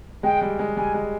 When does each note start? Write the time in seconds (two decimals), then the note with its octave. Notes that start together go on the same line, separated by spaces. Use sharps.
0.23 G#3 G5
0.41 G3
0.59 G#3
0.77 G3 G#5
0.94 G#3